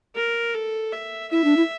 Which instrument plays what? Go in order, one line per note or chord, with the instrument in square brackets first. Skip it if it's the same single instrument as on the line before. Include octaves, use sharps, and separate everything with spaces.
[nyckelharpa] A#4
A4
E5
[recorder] E4 [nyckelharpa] E5
[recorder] D4
E4